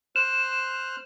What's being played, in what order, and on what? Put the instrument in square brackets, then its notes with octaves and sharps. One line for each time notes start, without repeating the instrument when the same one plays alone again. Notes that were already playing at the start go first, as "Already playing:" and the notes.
[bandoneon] C5 F6 F#6 [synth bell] E7